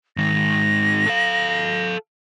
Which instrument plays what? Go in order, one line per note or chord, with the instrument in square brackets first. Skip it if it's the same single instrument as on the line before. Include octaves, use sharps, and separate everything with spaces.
[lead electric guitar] G#2 D#3 [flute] A#6
[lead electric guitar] A4 F5